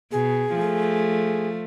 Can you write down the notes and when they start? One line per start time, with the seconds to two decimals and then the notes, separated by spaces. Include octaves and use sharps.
0.12 B2 G#4
0.55 F3 A3